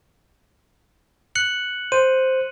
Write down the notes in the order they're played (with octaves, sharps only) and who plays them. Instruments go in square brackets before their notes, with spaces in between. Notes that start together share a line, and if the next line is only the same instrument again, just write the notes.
[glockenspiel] F#6 C#7 F#7
[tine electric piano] C5 [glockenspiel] D#7